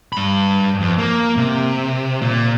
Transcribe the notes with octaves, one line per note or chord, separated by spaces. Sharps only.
G2 B5
F2
A#3
C3
A#2